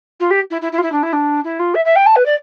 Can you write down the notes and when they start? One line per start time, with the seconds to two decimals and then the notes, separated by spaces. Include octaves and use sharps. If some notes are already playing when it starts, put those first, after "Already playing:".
0.20 F4
0.30 G4
0.51 E4
0.62 E4
0.72 E4
0.78 F4
0.83 E4
0.92 D4
1.03 E4
1.13 D4
1.44 E4
1.59 F4
1.75 E5
1.85 E5
1.96 G5
2.06 A5
2.16 B4
2.26 D5